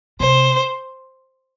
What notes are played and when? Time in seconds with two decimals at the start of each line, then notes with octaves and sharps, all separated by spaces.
0.20 C3 C5